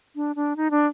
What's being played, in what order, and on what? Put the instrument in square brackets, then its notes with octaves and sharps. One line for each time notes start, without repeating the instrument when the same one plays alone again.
[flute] D4
D4
D#4
D4